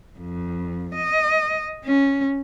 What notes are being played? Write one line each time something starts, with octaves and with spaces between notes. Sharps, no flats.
F2
D#5
C#4